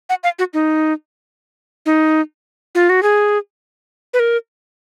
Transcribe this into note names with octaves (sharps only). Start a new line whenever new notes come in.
F#5
F5
F#4
D#4
D#4
F4
F#4
G#4
B4
A#4